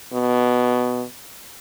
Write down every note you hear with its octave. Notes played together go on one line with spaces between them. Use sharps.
B2